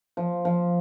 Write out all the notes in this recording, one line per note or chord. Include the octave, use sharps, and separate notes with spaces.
F3
F3